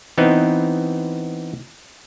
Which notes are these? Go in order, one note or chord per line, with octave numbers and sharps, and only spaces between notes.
E3 B3 C4 D#4